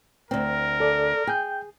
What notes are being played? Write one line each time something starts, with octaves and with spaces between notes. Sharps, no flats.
D2 C4 A#4
A4 D5
G#4 G5 G6